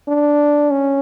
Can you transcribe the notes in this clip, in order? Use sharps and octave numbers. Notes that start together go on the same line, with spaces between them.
D4
C#4